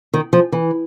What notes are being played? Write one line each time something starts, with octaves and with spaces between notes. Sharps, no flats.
D#3
F3
E3